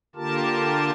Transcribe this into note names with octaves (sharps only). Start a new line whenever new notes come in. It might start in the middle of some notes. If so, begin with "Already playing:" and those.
D3 A#3 F4 G4 A#4 A5